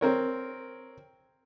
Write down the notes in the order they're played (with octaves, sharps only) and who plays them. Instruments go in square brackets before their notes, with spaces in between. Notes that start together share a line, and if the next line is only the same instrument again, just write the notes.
[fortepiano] C4 A#4 C#5